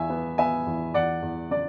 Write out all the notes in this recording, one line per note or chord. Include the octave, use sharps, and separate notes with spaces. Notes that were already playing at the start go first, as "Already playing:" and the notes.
Already playing: E2 E5 G#5
B3
B3 E5 G#5
E2
E2 D5 F#5
E2
C#3 D5